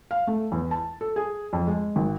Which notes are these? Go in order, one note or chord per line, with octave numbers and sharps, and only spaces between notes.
F5
A3
E2
A5
A4
G#4
F2
G#3
G#1